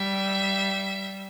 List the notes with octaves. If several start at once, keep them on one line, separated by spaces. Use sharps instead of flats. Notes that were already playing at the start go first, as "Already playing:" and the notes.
Already playing: G3 E5